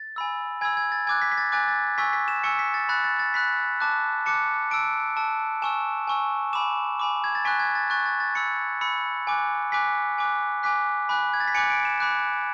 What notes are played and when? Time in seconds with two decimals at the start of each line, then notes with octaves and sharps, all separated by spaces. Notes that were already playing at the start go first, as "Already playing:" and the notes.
Already playing: A6
0.16 G#5 B5 E6
0.61 G#5 B5 E6 G#6
0.77 G#6
0.92 A6
1.07 G#5 D6 F#6 G#6
1.22 B6
1.32 B6
1.38 A6
1.52 G#5 D6 F#6 A6
1.68 A6
1.98 G#5 C#6 E6 B6
2.13 B6
2.28 E7
2.43 G#5 C#6 E6 C#7
2.59 B6
2.74 A6
2.89 B5 F#6 A6
3.04 A6
3.19 A6
3.34 B5 F#6 B6
3.80 A5 D6 F#6
4.26 A5 D6 F#6 C#7
4.71 A5 E6 D7
5.17 A5 E6
5.62 G#5 C#6 E6 E7
6.07 G#5 C#6 E6
6.53 G#5 B5 D6 E7
6.99 G#5 B5 D6
7.24 G#6
7.35 A6
7.45 G#5 C#6 F#6 B6
7.59 G#6
7.75 A6
7.90 G#5 C#6 F#6 A6
8.06 A6
8.20 A6
8.35 B5 E6 C#7
8.81 B5 E6 C#7
9.27 G#5 D6 F#6
9.72 G#5 D6 F#6 B6
10.18 G#5 D6 F#6
10.63 G#5 D6 F#6 B6
11.09 G#5 B5 D6 F#6
11.34 G#6
11.40 A6
11.48 B6
11.54 G#5 B5 D6 F#6 C#7
11.70 D7
11.85 E7
12.00 B5 D6 F#6